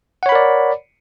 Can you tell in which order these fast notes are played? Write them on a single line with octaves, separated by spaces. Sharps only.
F#5 C#5 B5 A#4 D5